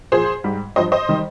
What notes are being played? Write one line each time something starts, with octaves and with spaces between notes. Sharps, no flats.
A#2 F3 G#4 C5
G#2 G3
G2 F3 C5 D#5
C5 D#5
D#3 G3